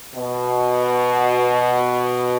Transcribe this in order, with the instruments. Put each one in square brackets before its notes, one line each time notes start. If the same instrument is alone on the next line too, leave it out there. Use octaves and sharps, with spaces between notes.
[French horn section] B2